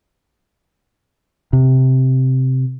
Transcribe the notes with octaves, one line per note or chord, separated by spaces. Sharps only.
C3